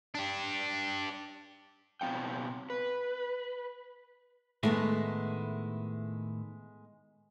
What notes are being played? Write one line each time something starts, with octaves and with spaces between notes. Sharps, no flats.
D4 G4
B2 G#3 C4 F5 G5
B4
A2 D#3 G#3 A3 B3 E4